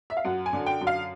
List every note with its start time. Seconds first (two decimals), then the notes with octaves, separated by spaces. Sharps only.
0.10 E5
0.17 F5
0.25 F#2 F#5
0.46 G#5
0.53 D3
0.66 G5
0.81 F#2
0.87 F5